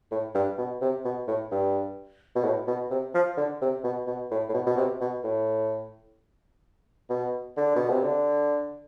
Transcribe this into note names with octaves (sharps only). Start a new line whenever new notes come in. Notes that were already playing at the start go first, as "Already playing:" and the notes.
A2
G2
B2
C3
B2
A2
G2
B2
A2
B2
C3
F3
D3
C3
B2
B2
A2
A2
B2
B2
C3
B2
A2
B2
D3
B2
C3
D3